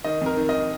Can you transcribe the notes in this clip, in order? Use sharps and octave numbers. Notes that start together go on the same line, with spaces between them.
D#3 D#5
F2 A#4
D#3
D#5